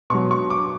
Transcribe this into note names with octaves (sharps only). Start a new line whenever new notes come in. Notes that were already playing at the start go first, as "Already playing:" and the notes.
B2 F#3 C#6
C#6
D6